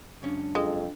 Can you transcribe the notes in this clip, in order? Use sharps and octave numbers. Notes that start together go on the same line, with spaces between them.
C#2 F#2 C#4 D4
F2 G#3